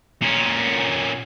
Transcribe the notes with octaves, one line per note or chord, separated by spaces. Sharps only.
A#2 C#4